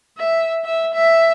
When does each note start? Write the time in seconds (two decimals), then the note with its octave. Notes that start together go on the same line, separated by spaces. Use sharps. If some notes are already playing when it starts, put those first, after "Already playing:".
0.18 E5
0.65 E5
0.94 E5